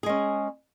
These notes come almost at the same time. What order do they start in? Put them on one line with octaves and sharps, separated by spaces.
G#4 G#3 C#4